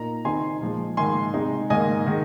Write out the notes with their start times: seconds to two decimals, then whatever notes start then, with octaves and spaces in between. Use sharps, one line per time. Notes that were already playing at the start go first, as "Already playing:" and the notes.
Already playing: A#2 A#3 D#4 A#5
0.25 D#3 C4 D#4 G#5 C6
0.61 A#2 F3 G#3
0.97 G#2 D#3 A#3 D#4 G#5 C6
1.34 C3 G#3 D#4
1.70 G#2 D#3 A#3 D#5 G#5
2.07 D#3 G#3